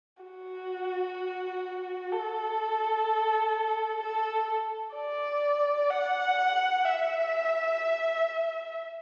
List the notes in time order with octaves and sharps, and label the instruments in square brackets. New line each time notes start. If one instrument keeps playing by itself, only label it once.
[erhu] F#4
A4
A4
D5
F#5
E5